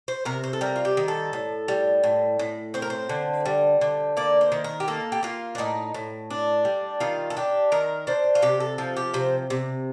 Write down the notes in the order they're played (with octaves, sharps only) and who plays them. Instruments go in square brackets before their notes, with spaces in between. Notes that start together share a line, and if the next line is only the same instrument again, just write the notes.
[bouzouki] C5
C3 A#4
C5
A4
G3 A#4
F4
G4
D#3
A4
A2
G3
A2
A2
C4 C5
A#4
C5
D3
G3
D3
A#3 D5
C5
D#3
A#4
G4
A#3 A4
G4
A#3 F4
D4
A2 D#4
A2
D4
G3
D#3 F4
A4
D4 G4
D#3 A#4
D4 C5
F4
C3 G4
A4
F3 A4
G4
C3 C5
C3